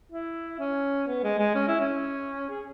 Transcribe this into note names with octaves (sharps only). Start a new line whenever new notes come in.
E4
C#4
B3
G#3
G#3
C#4
E4
C#4
G#4